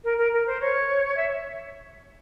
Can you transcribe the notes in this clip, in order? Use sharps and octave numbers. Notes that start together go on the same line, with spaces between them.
A#4
A#4
A#4
C5
C#5
E5